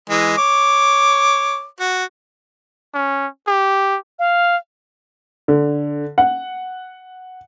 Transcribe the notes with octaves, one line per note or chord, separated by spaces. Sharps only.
E3 G#3
C#5 D6
F#4
C#4
G4
F5
D3
F#5